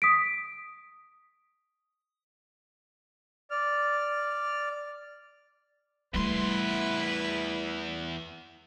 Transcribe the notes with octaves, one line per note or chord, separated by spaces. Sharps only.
D#6 B6 D7
D5 F6
E2 G3 A3 E4 B4 C6